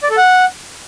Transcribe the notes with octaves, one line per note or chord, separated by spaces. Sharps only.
D5
A4
F#5